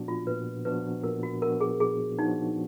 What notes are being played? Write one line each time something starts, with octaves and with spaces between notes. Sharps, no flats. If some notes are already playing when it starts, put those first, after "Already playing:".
Already playing: A#2 F3 B3 D4 F#4
F4
A#2 B4
F3 B3 D4 F#4 B4
A#2 A#4
F#4
F3 B3 D4 F#4 A#4
G#4
A#2 G#4
F3 B3 D4 D#4 F#4